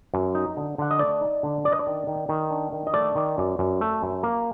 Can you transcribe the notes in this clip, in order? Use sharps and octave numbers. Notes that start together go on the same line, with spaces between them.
F#2
D#4
D3
D3 F#5
D#5
A3 D5
D#4
D3
D4 D5
D#5
D5
D#3
D#3
D#3
D4
D#3
D#5
A3 D5
D#3
F#2
F#2
A3
F#2
A#3